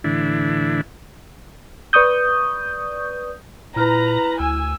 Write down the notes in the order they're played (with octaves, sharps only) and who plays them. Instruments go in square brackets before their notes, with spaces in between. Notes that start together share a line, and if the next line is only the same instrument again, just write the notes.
[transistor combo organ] A2 D3 E3 D4 E4
[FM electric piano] B4 D5 C#6 D#6 G6
[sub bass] A#2 [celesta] E4 F6 [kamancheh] B4 [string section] A#5
[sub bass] D2 [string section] G#5 [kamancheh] E6